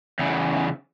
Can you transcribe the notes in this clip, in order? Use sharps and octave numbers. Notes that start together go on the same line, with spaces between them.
E2 C#3